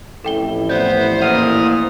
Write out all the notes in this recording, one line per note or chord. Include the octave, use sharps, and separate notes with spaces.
A1 F2 E4 A4 G5 G7
B3 C5 D5 G6
A#2 F#5 D#6 F6 F7